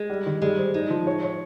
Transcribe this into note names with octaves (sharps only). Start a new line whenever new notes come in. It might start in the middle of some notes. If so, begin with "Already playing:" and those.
Already playing: G#3
G3
D#3
G3 G#3
C5
G#3 D#4
F3
C#5
C#5